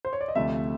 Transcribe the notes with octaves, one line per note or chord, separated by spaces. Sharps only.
C5
C#5
D5
D#5
D2 C3 F3 A3 E5